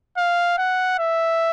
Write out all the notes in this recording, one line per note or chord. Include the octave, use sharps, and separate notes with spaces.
F5
F#5
E5